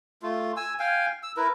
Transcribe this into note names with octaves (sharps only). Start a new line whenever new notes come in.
A3 F4
G#5 E6
F5 G5 G#5
E6
E4 A#4 B4